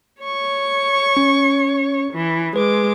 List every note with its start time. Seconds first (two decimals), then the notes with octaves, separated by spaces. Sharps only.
0.22 C#5 C#6
1.17 C#4
2.13 E3
2.56 G#3 B4 D6